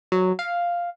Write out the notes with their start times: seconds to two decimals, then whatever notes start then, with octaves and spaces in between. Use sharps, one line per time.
0.12 F#3
0.39 F5